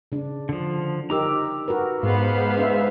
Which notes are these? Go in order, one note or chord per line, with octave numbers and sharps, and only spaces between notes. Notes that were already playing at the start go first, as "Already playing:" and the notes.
C#3 D4
D3 F3
D#4 G4 A#4 A#5 D6 E6
F#4 A#4 B4
G#2 B3 C5 F5
D4 B4 E5